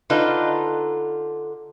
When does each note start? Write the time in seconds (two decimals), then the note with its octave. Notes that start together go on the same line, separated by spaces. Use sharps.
0.10 D3 D#4 F4 A4 B4